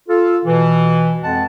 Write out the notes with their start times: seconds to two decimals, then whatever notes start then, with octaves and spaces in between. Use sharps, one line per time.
0.09 F4 A4
0.45 B2 E3
1.23 F2 G#3 F#5 A5